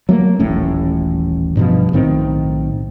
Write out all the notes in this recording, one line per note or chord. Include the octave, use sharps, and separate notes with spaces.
F#3 A3 A#3
D#1 A1 A2 C#4
G2 B2 F3
B1 A2 D#3 C4